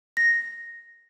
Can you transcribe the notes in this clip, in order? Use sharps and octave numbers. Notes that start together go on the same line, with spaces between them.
A#6